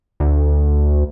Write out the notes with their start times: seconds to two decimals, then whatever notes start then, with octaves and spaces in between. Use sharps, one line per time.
0.20 D2